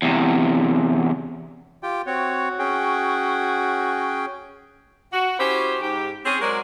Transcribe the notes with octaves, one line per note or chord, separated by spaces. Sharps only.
E2 C3
F4 G4 G5
C4 F#4 C#5
C#4 G#4 G5
F#4
C#4 E4 F#4 G4 C5
G#2 G4
C4 C#4 G#4
F#3 G#3 C4 F#4 A#4 D5